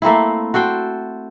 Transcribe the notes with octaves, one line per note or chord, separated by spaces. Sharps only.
A3 A#3 C4 E4
F#4 A4 C5 G5